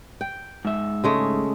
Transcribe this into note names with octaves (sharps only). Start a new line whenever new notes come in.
G5
G#2 E5
C#3 G#3 A3